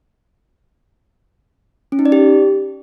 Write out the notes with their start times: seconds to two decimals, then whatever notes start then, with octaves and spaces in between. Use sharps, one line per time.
1.92 C#4
1.99 D#4
2.06 D5
2.12 G4